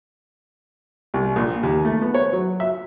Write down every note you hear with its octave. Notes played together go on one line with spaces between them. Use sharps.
C2
A#1
D#2
A3
B3
C#5
F#3
E5